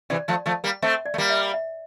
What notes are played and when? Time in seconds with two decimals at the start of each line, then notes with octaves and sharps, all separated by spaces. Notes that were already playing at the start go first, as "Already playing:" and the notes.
0.10 C3 E3 D5
0.28 F3 A3
0.46 F3 A3
0.64 G3 A#3
0.82 A3 C4 E5
1.06 D5
1.14 A3
1.18 G3 A#3
1.30 E5
1.54 E5